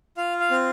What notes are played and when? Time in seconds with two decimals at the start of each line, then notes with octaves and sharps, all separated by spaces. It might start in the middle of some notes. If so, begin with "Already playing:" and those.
0.17 F4 F5
0.40 F5
0.51 C4